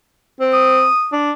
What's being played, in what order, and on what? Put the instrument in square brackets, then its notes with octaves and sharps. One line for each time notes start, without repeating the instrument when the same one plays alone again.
[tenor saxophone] C4
[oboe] D#6
[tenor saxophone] D4